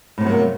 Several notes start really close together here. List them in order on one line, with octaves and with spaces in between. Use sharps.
A2 C3 B3 F#3 A#3